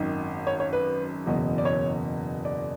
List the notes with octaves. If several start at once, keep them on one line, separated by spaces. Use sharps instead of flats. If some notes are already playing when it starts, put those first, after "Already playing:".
Already playing: G#1 F#2 D#3
C#5
C#5
B4
F#1 E2 B2
D5
C#5
D5